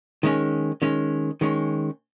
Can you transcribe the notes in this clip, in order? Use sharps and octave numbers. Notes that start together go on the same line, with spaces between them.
D#3 G#3 C#4
D#3 G#3 C#4
D#3 G#3 C#4